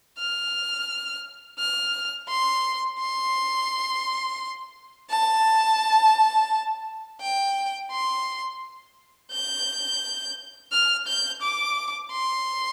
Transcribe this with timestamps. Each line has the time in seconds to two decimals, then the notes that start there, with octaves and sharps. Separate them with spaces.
0.18 F6
1.59 F6
2.29 C6
3.00 C6
5.10 A5
7.21 G5
7.91 C6
9.32 G6
10.72 F6
11.07 G6
11.42 D6
12.12 C6